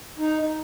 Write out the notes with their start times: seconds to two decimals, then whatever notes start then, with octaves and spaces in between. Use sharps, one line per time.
0.18 D#4